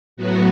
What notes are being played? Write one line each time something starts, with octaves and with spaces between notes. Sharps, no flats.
A2 F#3 B3 F#4